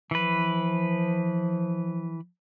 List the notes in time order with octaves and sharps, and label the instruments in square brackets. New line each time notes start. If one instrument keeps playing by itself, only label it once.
[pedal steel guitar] E3 B4 [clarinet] F3